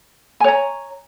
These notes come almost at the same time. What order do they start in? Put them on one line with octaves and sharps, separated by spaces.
G#5 C#5 A#5